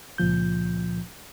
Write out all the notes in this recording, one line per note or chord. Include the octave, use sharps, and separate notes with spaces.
C#2 A#2 F3 G6